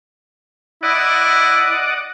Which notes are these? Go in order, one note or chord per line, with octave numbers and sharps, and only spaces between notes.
E4 D5 D#5 F#5